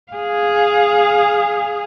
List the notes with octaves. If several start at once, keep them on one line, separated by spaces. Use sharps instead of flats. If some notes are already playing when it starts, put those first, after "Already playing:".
G#4 F5